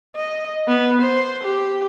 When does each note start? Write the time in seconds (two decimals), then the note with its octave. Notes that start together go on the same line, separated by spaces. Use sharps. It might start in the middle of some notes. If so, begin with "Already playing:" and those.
0.16 D#5
0.68 B3
1.01 C5
1.43 G4